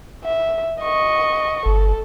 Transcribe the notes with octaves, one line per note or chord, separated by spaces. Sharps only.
E5
D#5 C#6
G1 A4